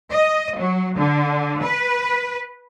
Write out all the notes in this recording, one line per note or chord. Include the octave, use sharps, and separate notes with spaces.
D#5
F#3
D3
B4